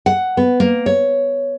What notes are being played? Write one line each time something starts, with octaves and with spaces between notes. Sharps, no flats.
F#5
B3
A#3
C#5